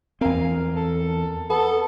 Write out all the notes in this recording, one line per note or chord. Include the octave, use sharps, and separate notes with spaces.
E2 C4 A#4 F5 G#5
A4
B3 A4